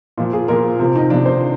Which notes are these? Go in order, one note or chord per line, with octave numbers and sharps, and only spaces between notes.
A#2 F3
G#4
A#2 F3 A#4
C3 F3
D#4
C3 F3 D4
C5